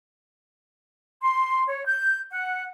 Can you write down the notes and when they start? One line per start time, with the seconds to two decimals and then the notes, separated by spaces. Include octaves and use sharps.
1.22 C6
1.68 C#5
1.86 G6
2.31 F#5